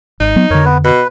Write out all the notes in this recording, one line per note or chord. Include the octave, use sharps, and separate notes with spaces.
G#1 D#4
F#3 B3
F2 D3 A#4 C#5
B3 B4
B2 B4